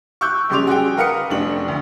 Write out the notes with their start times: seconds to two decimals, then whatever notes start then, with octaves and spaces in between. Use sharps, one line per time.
0.21 C#6 D6 E6 F#6 G6
0.50 A#1 C#3 G3 C6 D6 F7
0.67 F#4 G#4 G5
0.97 A#4 B4 F5 F#5 D#6 C#7
1.30 F1 A2 D4 F#7
1.68 D2